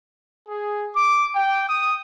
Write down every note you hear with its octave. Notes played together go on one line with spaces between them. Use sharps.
G#4
D6
G5
D#6